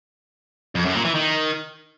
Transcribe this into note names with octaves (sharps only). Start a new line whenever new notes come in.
F2
F#2
A#2
E3
D#3